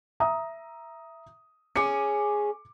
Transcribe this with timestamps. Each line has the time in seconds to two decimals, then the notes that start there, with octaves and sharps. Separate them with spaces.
0.20 E5 A#5 D#6
1.76 C#4 G#4 D6 C#7